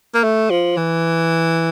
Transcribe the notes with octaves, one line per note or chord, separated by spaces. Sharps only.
A#3
A3
F3
E3